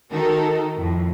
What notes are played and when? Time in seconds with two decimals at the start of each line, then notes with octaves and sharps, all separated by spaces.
0.10 D#3 D#4 F#4 A4 A#4
0.75 F2 A2